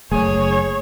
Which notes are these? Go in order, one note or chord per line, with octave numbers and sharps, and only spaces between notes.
F#1 A3 A#3 G#4 C#5